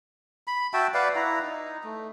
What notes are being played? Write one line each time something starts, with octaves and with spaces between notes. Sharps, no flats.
B5
F#4 E5 G5 A5
B4 D5 F5 F#5
E4 A#5
D#4
A3